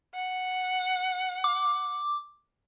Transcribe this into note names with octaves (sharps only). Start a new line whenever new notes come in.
F#5
D6